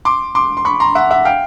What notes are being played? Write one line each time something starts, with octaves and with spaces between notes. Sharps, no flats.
C6 D6
C6 D6
C6
B5 C#6
A#5 C6
E5 F#5
E5 F#5
F5 G5